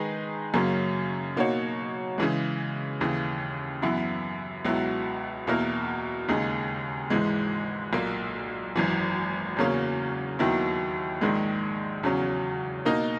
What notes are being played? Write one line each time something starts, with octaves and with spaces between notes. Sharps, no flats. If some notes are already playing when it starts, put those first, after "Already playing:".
Already playing: D#3 G#3 D#4 G#4 B4
F#2 C#3 F#3 A#3 C#4
B2 A#3 D#4 F#4 C#5
C#3 E3 G#3
D#2 C#3 E3
F#2 E3 B3 E4
C#2 B2 F#3 B3 E4
E2 B2 A#3 E4 A#4
D#2 C#3 G#3 D#4 G#4
G#1 G#2 E3 G#3
B1 A#2 A#3
G#1 F#2 E3
E2 C#3 F#3 A#3 C#4
D#2 D#3 F#3 B3 E4
A#1 G#2 D#3 G#3
E2 C#3 F#3 C#4
B2 A#3 D#4 A#4 D#5